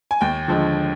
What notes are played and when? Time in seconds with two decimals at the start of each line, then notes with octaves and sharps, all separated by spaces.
0.11 G#5
0.21 D#2 G5
0.48 D3 F3 G#3